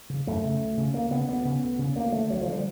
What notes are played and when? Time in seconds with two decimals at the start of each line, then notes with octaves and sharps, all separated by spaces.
0.10 C#3
0.27 F#2 A3
0.44 C#3
0.60 D2
0.77 C#3
0.94 D2 A#3
1.11 C#3 B3
1.28 D2 B3
1.45 C#3
1.63 D2
1.79 C#3
1.95 D2 A#3
2.12 D3 A3
2.30 D2 F#3
2.41 F3
2.46 D3
2.52 G3